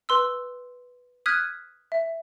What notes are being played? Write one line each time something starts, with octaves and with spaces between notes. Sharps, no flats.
B4 C6 E6
D#6 F6 F#6 G#6 B6 D#7
E5